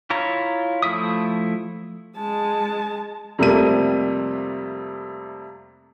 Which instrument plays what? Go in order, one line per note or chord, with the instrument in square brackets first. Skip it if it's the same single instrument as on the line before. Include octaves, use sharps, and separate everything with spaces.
[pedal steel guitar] E4 F4 C#5 A#5
F3 A3 E4 E5 D#6
[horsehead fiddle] G#3 A5
[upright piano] F2 C3 G3 A3 A#3 D#7